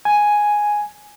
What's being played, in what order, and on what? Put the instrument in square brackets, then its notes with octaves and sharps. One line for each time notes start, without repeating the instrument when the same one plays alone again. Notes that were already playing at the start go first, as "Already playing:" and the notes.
[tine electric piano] G#5